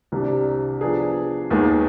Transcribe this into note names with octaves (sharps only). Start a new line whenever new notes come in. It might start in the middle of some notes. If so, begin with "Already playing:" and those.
C2 C3 G3 D4 G4
F3 B3 D4 G#4
D#2 D#3 G#3 B3